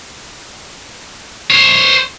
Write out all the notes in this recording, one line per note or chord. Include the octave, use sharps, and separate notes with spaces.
C5 C#5